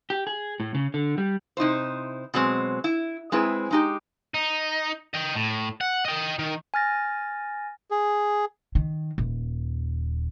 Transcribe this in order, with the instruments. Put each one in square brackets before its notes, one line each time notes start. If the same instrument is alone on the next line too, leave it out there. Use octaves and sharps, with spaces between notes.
[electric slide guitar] G4
G#4
A2
C#3
D3
G3
[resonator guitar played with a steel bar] C3 D#4 E4 C5
B2 F#3 G#3 C4
E4
G#3 C4 E4 G#4 B4
G#3 D#4 G4
[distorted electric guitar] D#4
D#5 G5
A2
F#5
D#5 G5
D#3
[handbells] G#5 F6 A6 A#6
[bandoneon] G#4
[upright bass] D#3
D#1